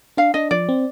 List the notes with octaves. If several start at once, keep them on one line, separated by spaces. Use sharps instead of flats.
D4 F5
D4 D#5
F3 D5
C4